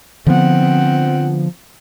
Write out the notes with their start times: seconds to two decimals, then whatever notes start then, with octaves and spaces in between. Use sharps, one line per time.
0.26 D3 F3 B3 C4 F#5